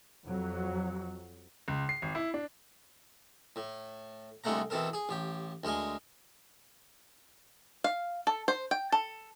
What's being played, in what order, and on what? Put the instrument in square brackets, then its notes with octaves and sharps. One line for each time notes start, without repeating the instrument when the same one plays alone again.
[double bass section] F2 F#3
[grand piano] C#2
C7
G#1
E4
D4
[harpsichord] A2
C2 D3 G#3 A3 F#5 A#5
B2 E3 C4 A4 A#4
G#4
A1 G4
D2 G#3 A#4 D#5 G#5
[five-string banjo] F5
A4
C5
G5
A4